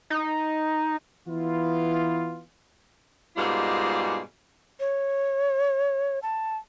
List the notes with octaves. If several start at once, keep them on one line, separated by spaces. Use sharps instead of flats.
D#4
E3 B3 E4 F4
G#2 B2 G3 G#3 A#3 F4
C#5
A5